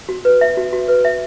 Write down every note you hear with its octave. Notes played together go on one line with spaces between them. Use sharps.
F#4
B4
E5
F#4
F#4
B4
E5